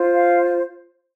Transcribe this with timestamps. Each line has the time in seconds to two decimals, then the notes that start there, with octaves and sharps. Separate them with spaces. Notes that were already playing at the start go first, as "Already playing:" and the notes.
Already playing: F4 C5
0.14 F5